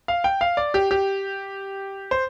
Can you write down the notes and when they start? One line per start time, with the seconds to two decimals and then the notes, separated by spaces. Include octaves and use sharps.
0.08 F5
0.24 G5
0.41 F5
0.57 D5
0.74 G4
0.91 G4
2.11 C5